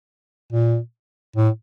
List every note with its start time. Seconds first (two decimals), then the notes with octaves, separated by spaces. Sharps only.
0.53 A#2
1.36 A2